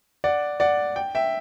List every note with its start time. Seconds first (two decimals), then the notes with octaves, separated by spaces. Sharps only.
0.24 D5 F#5
0.60 D5 F#5
0.96 G5
1.15 E5 G5